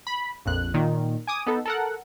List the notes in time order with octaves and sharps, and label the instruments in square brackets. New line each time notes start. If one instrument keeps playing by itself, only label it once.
[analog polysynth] B5
A#1 F2 F#6
A#2 D#3
G#5 D6 D#6
B3 D#4 A4
A4 A#4 F#5